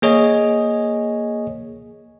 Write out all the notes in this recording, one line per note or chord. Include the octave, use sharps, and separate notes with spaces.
A#3 G#4 C#5 D#5 G#5